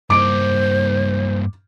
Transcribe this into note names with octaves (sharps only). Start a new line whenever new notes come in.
G2 A#3 C5 D6 D7